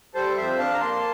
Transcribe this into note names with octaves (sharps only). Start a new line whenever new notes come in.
G3 A4 C5
F2 C5 E5
D4 F5 A5
A#5
A#3 A5 C6